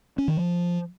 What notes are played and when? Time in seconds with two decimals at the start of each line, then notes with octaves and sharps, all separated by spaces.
0.18 C#4
0.28 D#3
0.37 F3